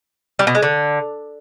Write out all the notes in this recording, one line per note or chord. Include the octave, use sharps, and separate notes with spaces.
G3
B2
G#3
D3